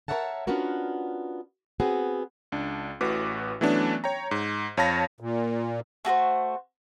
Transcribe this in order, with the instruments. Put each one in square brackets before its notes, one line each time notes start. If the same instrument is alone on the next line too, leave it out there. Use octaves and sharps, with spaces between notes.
[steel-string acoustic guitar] A#4 C5 C#5 E5 F#5 A5
B3 C#4 D4 F4 F#4 A#4
B3 C4 F#4 G#4
[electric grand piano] C#2 D4
A1 A2 F#4 B4 D6
E3 F#3 A3 B3 C#4 D4
C#5 G5 A#5
G#2
F2 C#5 F5 A5 B5 A#6
[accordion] A#2
[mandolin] A3 F#4 A4 C5